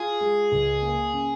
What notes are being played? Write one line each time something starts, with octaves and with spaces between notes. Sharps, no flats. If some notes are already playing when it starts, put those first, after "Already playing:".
Already playing: F4 G#4
G#3
C#2
A#3
C#3